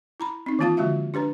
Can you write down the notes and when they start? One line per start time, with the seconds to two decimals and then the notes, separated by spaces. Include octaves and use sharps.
0.20 E4 A#5 B5
0.46 C4 D#4
0.59 D#3 E3 A#3 F4 F5 A5
0.77 D3 F3 G#3 F#4 E5 F5
1.14 D4 G4 B4 A#5